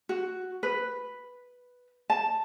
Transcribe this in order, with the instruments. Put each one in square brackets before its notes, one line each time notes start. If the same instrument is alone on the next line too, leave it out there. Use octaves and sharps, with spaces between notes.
[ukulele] F#4
B4
A5